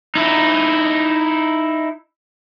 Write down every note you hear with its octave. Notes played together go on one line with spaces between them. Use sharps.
D#4 E4